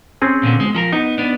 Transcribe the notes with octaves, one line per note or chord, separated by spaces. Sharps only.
C4 C#4 G#4
A#2 D3 B3
G#3
F3 A4 A#4
B3 D#4
B3 D4